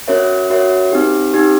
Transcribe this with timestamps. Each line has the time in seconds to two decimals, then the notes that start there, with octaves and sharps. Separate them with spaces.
0.08 C#4 F#4 A#4 C#5 E5
0.50 C#4 F#4 A#4 C#5 E5
0.92 C4 D#4 G4
1.33 C4 D#4 G4